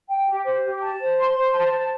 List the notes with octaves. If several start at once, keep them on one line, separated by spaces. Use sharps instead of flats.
G5
G4
C5
G4
A5
C5
C6
C5
A5
C5